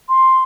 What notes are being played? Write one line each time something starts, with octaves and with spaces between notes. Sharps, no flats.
C6